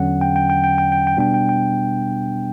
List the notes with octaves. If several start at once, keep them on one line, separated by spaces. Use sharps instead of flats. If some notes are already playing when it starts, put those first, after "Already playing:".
Already playing: E2 D3 F#3 C#4 F#5
G5
G5
G5
G5
G5
G5
G5
B2 G3 B3 D4 G5
G5
G5